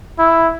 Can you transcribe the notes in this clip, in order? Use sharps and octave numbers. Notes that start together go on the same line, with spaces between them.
E4